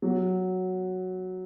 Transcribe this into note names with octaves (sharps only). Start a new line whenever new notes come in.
F#3